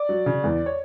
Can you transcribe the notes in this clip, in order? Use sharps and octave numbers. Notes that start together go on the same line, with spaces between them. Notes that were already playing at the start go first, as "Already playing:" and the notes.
Already playing: D5
F#3
C#3
E2
C#5